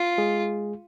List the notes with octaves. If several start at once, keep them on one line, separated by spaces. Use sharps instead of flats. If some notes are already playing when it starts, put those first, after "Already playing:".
Already playing: F4
G#3 G#4